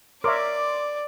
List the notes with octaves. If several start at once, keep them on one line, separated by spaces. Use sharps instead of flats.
A#4 C#5 D5 E5 C6 D6